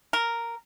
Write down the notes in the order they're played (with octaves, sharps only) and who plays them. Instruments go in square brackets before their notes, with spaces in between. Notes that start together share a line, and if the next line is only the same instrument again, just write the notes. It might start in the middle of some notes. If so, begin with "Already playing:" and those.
[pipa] A#4